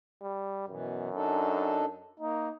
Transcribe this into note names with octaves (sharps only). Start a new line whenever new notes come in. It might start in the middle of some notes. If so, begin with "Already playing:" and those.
G3
F#2 B2 E3
D4 D#4 A4
A#3 D#4